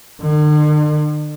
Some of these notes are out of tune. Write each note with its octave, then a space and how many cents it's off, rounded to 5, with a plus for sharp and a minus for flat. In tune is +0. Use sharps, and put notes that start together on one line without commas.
D3 +45